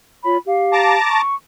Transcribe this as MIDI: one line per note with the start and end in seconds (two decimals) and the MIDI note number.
0.23 0.37 65
0.23 0.37 73
0.23 0.37 83
0.45 0.94 67
0.45 0.94 77
0.73 1.21 81
0.73 1.21 82
0.73 1.21 86
1.09 1.35 85